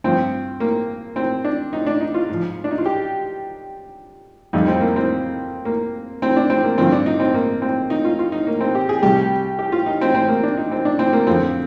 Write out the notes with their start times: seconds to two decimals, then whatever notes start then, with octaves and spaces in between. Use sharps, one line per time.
0.04 G2 F3 C4
0.60 A#3
1.16 C4
1.45 D4
1.73 D#4
1.87 D4
2.01 D#4
2.14 F4
2.29 G#2 F3
2.64 D4
2.71 D#4
2.78 F4
2.86 G4
4.53 F2 D#3 G3 D#4
4.68 C4
4.81 A#3
4.96 C4
5.65 A#3
6.22 C4
6.36 D4
6.50 C4
6.64 A#3
6.78 G2 D3 F3 C4
6.92 D4
7.06 D#4
7.20 C4
7.34 A#3
7.62 C4
7.90 D#4
8.04 F4
8.19 F4
8.32 D#4
8.47 A#3
8.61 C4
8.75 G4
8.89 G#4
9.02 C2 C3 G3 G4
9.59 G4
9.72 F4
9.86 D#4
10.01 C4
10.14 C4
10.28 A#3
10.43 D4
10.58 D#4
10.72 C4
10.85 D4
10.99 C4
11.13 A#3
11.27 F2 D3 F3 C4